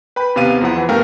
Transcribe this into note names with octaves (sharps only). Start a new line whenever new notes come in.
B4 G5 B5
D#2 C3 B3 F5 D#7
E2 F3 E4 F#5
E3
G2 A3 B3 A#4 F5 G5